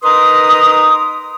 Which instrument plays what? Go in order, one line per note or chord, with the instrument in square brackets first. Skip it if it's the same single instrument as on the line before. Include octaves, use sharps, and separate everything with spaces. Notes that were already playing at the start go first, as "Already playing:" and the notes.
[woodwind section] D#4 A#4 B4 A#5 C6 D#6